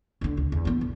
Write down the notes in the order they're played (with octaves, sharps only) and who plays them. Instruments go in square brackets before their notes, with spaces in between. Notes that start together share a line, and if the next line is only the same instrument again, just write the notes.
[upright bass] C#2 D3
C#2
E2
E3 B3
B1